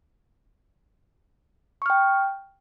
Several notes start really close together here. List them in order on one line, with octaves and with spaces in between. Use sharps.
C#6 F6 G5